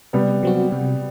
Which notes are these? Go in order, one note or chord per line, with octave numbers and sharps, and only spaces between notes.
C3 G3 B3
F#3 C4 F#4
C3